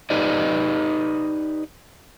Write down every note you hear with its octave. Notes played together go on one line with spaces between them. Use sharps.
D#4 G4 B4 D5 D#5